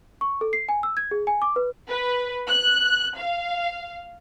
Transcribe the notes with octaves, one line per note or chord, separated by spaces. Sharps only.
C#6
A4
C7
G#5
E6
G#6
G#4
G#5
D6
B4
B4
F#6
F5